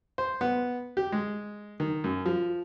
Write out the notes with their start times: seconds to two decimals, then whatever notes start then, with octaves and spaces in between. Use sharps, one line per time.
0.18 C5
0.41 B3
0.97 G4
1.12 G#3
1.80 D#3
2.04 F#2
2.26 F3